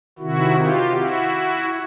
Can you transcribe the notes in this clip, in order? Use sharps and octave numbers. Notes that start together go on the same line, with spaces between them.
C3 D#3 E4 F#4
F4 G4
E4 F#4